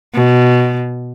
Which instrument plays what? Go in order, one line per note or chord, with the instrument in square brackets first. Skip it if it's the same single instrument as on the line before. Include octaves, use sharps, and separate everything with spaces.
[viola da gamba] B2